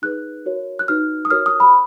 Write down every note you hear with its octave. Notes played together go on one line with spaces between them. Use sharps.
D#4 G#4 B4 F#6
F#4 A#4 C#5
F#6
D#4 F#4 B4 F6
D#6
F#4 A#4 C#5 F6
D#6
B5